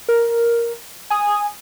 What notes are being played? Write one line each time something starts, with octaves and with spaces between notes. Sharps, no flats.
A#4
G#5 D#6